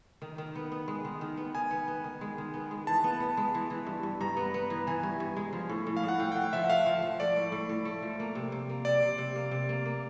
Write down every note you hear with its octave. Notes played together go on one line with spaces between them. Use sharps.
D#3
D#3
B3
B3
G#3
D#3
D#3
B3
D#3 G#5
B3
B3
D#3
G#3
D#3
B3
G#3
E3 A5
B3
B3
G#3
E3
E3
G2
G2
G2 A#5
B3
B3
E3
E3 G#5
G2
G2
G#3
F3
A2
A2
F5
A2 F#5
A2 G5
G5
A2 F#5
F3 E5
F#5
A3 F5
F3
F3
A3 D5
A2
A2
A2
A3
F3
A#3
C3
C3
A#3
C3 D5
C3
C3
A#3
C3
A#3
A#3